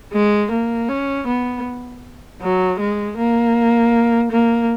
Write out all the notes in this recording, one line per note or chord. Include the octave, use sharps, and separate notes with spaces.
G#3
A#3
C#4
B3
F#3
G#3
A#3
A#3